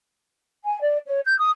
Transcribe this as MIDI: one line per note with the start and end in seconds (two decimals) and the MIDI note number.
0.64 0.80 80
0.81 0.98 74
1.07 1.20 73
1.26 1.37 91
1.39 1.50 87